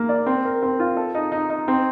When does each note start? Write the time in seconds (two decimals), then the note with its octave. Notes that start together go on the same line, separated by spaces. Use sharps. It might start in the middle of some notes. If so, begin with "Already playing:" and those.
Already playing: A#3
0.09 D5
0.26 C4
0.45 A#4
0.63 C4
0.80 F4
0.97 A4
1.15 D#4
1.32 D#4
1.50 D#4
1.68 C4